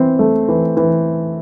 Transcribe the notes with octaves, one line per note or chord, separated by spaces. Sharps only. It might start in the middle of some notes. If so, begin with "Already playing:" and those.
Already playing: E3 C4
A3
E3
E3